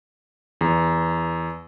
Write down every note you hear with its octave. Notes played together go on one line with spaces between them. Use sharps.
E2